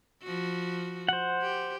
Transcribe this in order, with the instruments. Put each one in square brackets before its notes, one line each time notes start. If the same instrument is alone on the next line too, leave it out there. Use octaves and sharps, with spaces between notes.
[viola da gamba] F3 F#4
[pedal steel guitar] C5 F#5
[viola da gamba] G4